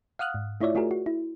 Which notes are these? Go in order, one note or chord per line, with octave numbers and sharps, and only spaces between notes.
F5 F#5 D#6 F6 F#6
G#2
A3 E4 F4 C#5 D5 E5
A3 F4 F#4 G#4 A#4
F#4
E4